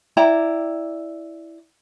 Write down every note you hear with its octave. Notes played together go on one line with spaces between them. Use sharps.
E4 D5 G5 A#5